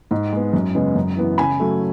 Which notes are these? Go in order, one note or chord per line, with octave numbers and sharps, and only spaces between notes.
G#2
G#3 B3
F#2
C#3 G#3 B3
F#2
E3 B3
C#3 G#5 B5
F#3 A3